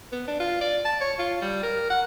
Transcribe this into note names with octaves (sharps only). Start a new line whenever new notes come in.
B3
D4
F4
D5
A5
C#5
F4
G3
A#4
F#5